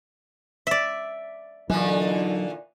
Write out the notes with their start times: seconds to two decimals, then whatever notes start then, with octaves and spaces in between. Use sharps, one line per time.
0.67 D5 E5
1.70 A#2 D3 E3 F#3 D#4